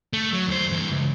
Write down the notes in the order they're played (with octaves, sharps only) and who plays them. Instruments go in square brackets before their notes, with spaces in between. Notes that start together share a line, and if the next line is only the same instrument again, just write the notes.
[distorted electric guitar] A3
F#3
D#2 C5
G2 E3
C#2